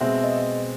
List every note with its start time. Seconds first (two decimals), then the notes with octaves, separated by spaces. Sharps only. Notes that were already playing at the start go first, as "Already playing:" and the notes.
0.01 B2 G#3 C4 E5
0.24 D#5